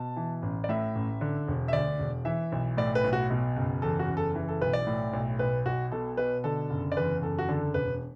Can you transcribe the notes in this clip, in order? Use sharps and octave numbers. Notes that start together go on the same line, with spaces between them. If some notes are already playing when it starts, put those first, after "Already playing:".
Already playing: B2 A5
E3
A1
D5
A2 E5
A1
D3
E1
E5
D2 D5
E1
E3 E5
B1
A2 D5
B4
B1
F#4
B2
F#1
E2 A4
F#4
F#1
A4
E3
A4
B1 B4
D5
A2
B1
B1 B4
B1 F#4
B2 A4
B2 B4
D3 A4
F#1
D5
E2 B4
F#1 A4
F#4
D3 A4
E1 B4